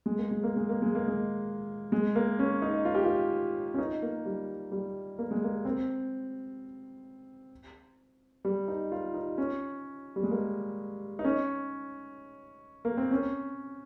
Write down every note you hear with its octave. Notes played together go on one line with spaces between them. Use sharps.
G#3
A#3
G#3
A#3
G#3
A#3
G#3
A#3
G#3
G#3
A#3
C#4
D#4
F4
G4
F4
C#4
D#4
A#3
G3
G3
A#3
G#3
A#3
C4
G3
D#4
F4
D#4
C#4
G3
G#3
A#3
D#4
C#4
A#3
C4
C#4